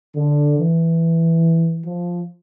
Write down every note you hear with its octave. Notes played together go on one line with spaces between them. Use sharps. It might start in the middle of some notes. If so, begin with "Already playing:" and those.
D3
E3
F3